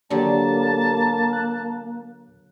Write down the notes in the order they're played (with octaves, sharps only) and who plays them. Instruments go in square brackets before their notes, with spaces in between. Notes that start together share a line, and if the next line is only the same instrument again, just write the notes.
[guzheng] D3 F#3 [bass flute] A#3 [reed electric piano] G4 D5 [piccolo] A5
[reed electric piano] F#6